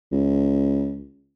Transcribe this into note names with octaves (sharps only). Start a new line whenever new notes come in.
C#2